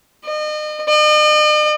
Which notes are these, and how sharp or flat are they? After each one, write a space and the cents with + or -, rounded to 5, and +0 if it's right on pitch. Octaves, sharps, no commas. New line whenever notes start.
D#5 -35
D#5 -45